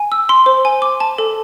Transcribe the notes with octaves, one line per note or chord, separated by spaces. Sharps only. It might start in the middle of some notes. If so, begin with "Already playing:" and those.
Already playing: G#5
E6
C6
C5
G#5
D6
A5
A4